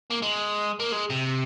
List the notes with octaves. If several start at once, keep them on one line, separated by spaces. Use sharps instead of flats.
A#3
G#3
A#3
G#3
C3